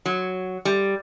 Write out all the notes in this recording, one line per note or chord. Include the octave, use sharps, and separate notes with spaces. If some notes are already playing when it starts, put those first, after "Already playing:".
F#3
G3